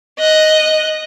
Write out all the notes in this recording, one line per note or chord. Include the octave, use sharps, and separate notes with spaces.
D#5 F#6